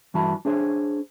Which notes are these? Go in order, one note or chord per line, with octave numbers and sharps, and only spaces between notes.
G2 E3 F#4 A5 B5
D4 G#4 C5 C#5